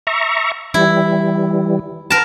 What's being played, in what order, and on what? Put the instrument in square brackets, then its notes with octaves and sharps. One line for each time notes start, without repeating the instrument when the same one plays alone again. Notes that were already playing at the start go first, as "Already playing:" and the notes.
[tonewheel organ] E5 A#5 C#6
[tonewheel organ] E3 G3 [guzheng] E4
[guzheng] A#4 A5 [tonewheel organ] B4